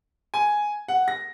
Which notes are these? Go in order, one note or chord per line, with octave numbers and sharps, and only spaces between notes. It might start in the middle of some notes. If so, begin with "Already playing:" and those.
G#5
F#5
A#6